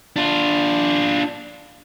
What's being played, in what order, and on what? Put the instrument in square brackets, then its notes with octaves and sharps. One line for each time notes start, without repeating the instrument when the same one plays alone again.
[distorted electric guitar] D4 F4